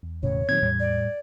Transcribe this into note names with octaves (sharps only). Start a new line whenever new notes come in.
E2
E1 A2 C#3 C#5
A#2 D#3 F#3 C4 G#6
E2 A2 G3
D5